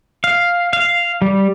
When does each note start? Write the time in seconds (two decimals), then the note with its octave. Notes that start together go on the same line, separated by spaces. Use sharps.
0.24 F5
0.73 F5
1.22 G3